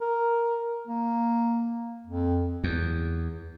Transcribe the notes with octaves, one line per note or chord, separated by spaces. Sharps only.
A#4
A#3
F2
E2